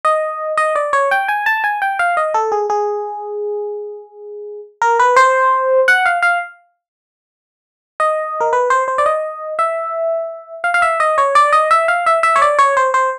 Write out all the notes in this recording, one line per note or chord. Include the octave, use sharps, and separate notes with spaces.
D#5
D#5
D5
C#5
G5
G#5
A5
G#5
G5
F5
D#5
A4
G#4
G#4
A#4
B4
C5
F#5
F5
F5
D#5
A#4
B4
C5
C5
D5
D#5
E5
F5
F5
E5
D#5
C#5
D5
D#5
E5
F5
E5
E5
C#5
D5
C#5
C5
C5